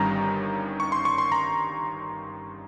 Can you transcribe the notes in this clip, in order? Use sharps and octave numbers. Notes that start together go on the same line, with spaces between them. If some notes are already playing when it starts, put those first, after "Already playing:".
Already playing: G1 G2 D#3 G3 C#4 A#5
C#6
C6
C#6
C6
A#5